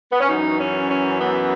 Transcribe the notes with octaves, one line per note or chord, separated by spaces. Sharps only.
B3
C#4
F#2 E3 D#4
C#4
C#4
B3